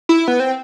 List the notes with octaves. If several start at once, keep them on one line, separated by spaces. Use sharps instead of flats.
E4
B3
C4